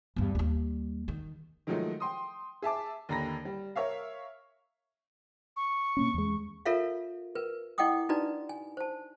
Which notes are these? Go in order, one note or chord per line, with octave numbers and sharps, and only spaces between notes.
E2 G2
D#2 G3
D#3
D#3 F3 F#3 G#3 A3 D#4
G5 C6 D#6
G#4 E5 A5 D6
D#2 D3 A#5 B5 A#6
G3
A#4 C#5 E5 F5
C#6
B2 A#3 C#4
E2 G#3
F4 A4 A#4 C#5 E5 F5
A#4 B4
E4 D#5 F#5 G5 D6 D#6
D4 D#4 F#4 B4 D5 A#5
G#5
C5 A5